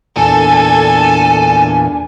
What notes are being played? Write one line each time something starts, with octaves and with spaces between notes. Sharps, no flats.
E2 A#2 D4 A4 G#5